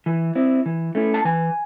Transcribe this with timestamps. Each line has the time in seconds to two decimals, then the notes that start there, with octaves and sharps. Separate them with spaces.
0.06 E3
0.35 C4 E4
0.66 E3
0.95 A3 C#4 E4
1.14 A5
1.25 E3 G#5